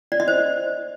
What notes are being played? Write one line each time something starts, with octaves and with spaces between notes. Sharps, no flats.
D5
D#5
C5